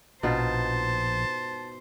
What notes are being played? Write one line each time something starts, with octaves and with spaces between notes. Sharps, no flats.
A#1 B2 D#4 F4 C5 A5